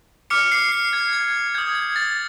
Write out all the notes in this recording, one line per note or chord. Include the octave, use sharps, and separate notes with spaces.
D6 F6 C#7
C7
C7
G#6
G#6
D#6 G6 G#6
G#6
A6